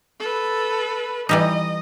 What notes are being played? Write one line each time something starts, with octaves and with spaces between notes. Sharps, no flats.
A4 B4
E3 G3 D#4 D#5